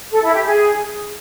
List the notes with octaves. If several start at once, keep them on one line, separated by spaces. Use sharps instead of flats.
A4
E4
G4
G#4